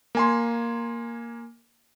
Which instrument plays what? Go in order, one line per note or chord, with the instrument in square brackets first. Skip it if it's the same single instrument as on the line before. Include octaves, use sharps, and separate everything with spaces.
[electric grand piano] A#3 G#5 C6